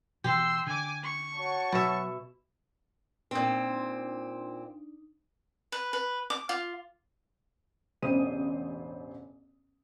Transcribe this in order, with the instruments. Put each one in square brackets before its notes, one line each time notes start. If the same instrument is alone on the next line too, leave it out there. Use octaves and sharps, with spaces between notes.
[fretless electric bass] B2 E3 [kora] G4 [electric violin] C6 E6
[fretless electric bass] D3 [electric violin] G#5 D6
[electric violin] C#6
[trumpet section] F#4 C#5 A5
[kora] B2 E5 [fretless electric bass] F#3
[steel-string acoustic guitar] A#2 C4 [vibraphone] D4 D#4
[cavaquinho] B4
B4
D6
F4
[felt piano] E1 A1 C#3 C5 D#6 D#7